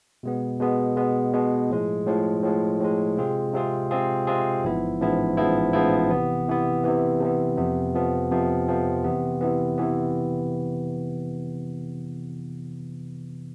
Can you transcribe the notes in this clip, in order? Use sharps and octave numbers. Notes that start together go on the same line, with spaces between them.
B2 G#3 B3
B2 G#3 B3
B2 G#3 B3
B2 G#3 B3
A2 F3 G#3
A2 F3 G#3
A2 F3 G#3
A2 F3 G#3
C3 G#3 C4 F4 G#4
C3 G#3 C4 F4 G#4
C3 G#3 C4 F4 G#4
C3 G#3 C4 F4 G#4
A1 G#2 F3 B3 E4
A1 G#2 F3 B3 E4
A1 G#2 F3 B3 E4
A1 G#2 F3 B3 E4
C3 E3 B3
C3 E3 B3
C3 E3 B3
C3 E3 B3
F2 C3 F3 B3
F2 C3 F3 B3
F2 C3 F3 B3
F2 C3 F3 B3
C3 E3 B3
C3 E3 B3
C3 E3 B3